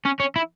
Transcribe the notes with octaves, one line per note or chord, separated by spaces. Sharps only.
C#4
C#4
E4